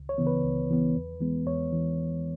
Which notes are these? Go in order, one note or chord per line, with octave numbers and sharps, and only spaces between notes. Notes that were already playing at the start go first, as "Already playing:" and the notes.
Already playing: C#2
C#5
C#3 E3 B3
B4
C#2
C#3 E3 B3
E2
E3 G#3 B3
E2 C#5
E3